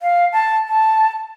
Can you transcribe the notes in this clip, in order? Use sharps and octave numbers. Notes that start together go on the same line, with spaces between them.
F5
A5
A5